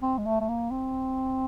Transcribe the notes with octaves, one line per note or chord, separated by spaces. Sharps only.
C4
G#3
A3
A3
A#3
C4